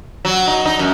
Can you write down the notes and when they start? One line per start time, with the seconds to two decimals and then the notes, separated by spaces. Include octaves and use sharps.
0.25 F#3
0.48 D#4
0.65 D#4
0.79 F#2